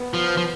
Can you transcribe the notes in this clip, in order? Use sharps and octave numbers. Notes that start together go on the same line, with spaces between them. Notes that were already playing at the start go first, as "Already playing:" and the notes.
Already playing: B3
F3
F3